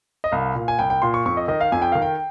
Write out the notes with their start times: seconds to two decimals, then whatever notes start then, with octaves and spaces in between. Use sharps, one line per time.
0.24 D#5
0.32 C2 F5
0.55 A#2
0.68 G#5
0.79 C2 G5
0.90 G5
1.02 A#2 C6
1.14 C#6
1.25 F2 C#6
1.37 D#5
1.48 D#3 D#5
1.61 F5
1.72 F2 G#5
1.82 G5
1.92 D#3 F5
2.02 G5